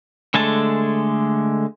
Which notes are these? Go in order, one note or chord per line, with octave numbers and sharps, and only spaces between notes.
D3 G#3 A3 G#5 A5